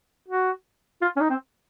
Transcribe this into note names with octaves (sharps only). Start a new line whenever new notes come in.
F#4
F4
C#4
D#4
C4